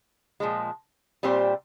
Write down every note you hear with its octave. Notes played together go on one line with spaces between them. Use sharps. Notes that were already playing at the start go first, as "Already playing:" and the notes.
A#2 F3 G#3
A#2 G3 C4 G4 C5